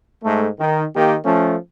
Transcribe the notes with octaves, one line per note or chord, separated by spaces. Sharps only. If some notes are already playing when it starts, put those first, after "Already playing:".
G#2 A3
D#3
D#3 A#3 G4
F3 A3 C#4